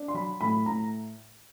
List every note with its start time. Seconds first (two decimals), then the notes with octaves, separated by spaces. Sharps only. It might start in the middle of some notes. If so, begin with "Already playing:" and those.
Already playing: D4
0.08 C6
0.14 F#3 B5
0.41 A2 B5
0.66 A2 A#5